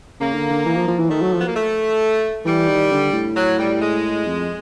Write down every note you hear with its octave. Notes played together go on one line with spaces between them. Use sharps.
C#3 A#3
D3
D3
E3
F3
F3
E3
D#3 A3
F#3
F3 B3
A#3
A3
E3 G3
D#3
D3
A2
F#3
G3
G#3
F2